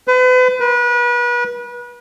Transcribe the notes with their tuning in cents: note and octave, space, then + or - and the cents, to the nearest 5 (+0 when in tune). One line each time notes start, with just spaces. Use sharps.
B4 +40
B4 -35